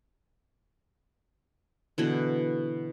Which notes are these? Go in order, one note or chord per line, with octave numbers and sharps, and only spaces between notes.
B2 D3 E3